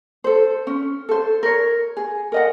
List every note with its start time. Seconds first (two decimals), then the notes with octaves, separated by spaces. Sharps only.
0.24 A4 C5
0.67 C#4
1.09 A4 C5
1.43 A#4 C#5
1.97 G#4
2.32 A#4 D#5 F#5